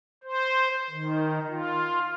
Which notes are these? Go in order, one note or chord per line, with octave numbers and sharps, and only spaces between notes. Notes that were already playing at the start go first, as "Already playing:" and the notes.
C5
D#3
F4